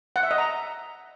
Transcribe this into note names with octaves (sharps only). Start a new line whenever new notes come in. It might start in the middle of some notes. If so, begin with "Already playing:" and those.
F#5
E5
D#5
A#5